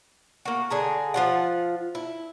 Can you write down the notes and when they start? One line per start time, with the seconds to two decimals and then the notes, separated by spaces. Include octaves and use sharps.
0.45 A#3 F#4
0.70 D3 G#4 A#5
1.14 F3 F4 F#5
1.95 E4